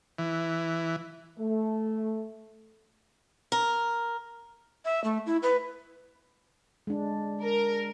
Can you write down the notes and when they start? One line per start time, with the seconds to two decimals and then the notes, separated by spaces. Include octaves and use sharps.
0.18 E3
1.39 A3
3.52 A#4
4.85 E5
5.04 A3
5.26 E4
5.43 B4
6.87 G#3 D4
7.42 A#4